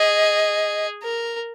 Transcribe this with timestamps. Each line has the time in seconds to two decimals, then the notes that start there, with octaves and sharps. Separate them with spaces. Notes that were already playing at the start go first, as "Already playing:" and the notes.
Already playing: G#4 D#5
1.03 A#4